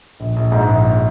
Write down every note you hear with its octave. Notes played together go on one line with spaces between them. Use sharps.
A#1
A#1
G#2
A#1